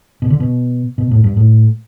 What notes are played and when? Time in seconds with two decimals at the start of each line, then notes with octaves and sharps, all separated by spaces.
0.22 B2
0.30 D3
0.40 B2
0.98 B2
1.11 A2
1.24 G2
1.37 A2